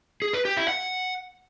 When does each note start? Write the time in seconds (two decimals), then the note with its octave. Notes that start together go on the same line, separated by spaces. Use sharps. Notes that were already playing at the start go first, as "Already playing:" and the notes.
0.22 G#4
0.33 B4
0.45 G4
0.57 E4
0.68 F#5